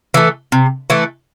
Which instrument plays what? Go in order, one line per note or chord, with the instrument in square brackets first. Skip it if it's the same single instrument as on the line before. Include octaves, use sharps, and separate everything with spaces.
[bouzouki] E3 A3
C3
E3 A3